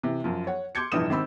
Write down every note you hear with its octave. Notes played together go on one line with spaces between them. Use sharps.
C3 E3
F#2 F3
C#5 F#5
C6 D6 G6 G#6 C#7
F1 A#1 G2 E3 D#6 E7
G#1 C4 B5 E6